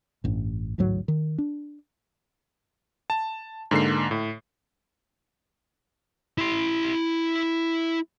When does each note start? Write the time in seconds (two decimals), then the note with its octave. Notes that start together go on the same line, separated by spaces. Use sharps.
0.24 A1 G2
0.78 A1 D2 G#2 F#3
1.08 D#3
1.38 D4
3.10 A5
3.71 G#2 D3 A#3 C7
4.11 A2
6.38 E4 C6